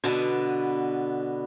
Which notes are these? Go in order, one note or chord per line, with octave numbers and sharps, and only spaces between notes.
B2 D3 B3